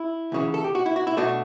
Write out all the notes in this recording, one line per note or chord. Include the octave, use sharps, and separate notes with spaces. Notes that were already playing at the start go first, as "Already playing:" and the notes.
Already playing: E4
D2 C#3 E3
A4
G4
F#4
E4
F#4
E4
B2 A3 D4 F#4